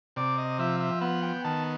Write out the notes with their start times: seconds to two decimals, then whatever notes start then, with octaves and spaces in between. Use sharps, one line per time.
0.16 C3 D5
0.38 D#5
0.58 F3 E5
0.80 E5
1.01 B3 F#5
1.23 G5
1.44 D#3 A5